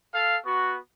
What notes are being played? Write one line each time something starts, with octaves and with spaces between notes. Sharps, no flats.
A4 F5
B3 F#4